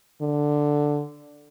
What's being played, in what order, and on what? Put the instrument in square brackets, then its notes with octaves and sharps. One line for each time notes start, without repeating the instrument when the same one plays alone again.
[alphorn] D3